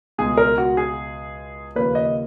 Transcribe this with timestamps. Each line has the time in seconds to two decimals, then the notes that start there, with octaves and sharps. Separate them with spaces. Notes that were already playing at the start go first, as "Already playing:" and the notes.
0.18 C#2 B2 G#3 G#4
0.37 A#4
0.58 F#4
0.77 G#4
1.76 D#2 C#3 F3 A#3 B4
1.95 D#5